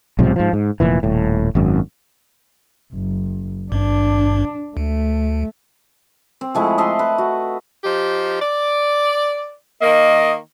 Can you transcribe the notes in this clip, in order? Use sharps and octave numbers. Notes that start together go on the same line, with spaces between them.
B1 G#2 C3 F3
G#2 F3
G#2
F1 A#2 E3
D#1 A2
G#1 F#2
F#1
G#1 G2 D4
D2 A3
C4
F3 G#3 A3 E4
D#5 E5 A5 C6
B4
F#4
F3 D#4 G4
D5
D#3 A#3 D#5